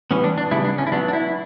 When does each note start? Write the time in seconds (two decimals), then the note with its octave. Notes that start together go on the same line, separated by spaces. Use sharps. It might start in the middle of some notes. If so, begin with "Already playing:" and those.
0.11 E3 G3 B3 C#4
0.24 D4
0.38 D4
0.51 C#3 G3 B3 E4
0.65 D4
0.78 C#4
0.87 E4
0.92 F#3 B3 D4
1.08 D4
1.13 E4